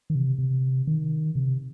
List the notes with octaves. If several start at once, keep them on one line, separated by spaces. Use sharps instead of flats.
D#3
C3
C3
D#3
C3